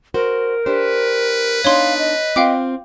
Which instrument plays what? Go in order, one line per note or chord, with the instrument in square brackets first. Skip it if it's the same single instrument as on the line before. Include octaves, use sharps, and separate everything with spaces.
[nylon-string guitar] F#4 C5 [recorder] A#4
[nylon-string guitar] D4 G4 C5 [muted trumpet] B4
[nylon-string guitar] B3 D4 D#4 [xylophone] C#5 C6 [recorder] F5
[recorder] D#5
[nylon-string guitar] C4 F4 [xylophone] F5 G5 D6